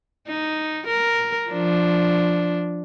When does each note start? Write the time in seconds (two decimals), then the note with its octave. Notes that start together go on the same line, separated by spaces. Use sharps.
0.28 D#4
0.86 A#4
1.50 F3 D4